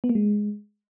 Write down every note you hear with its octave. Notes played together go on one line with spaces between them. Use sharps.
B3
A#3
G#3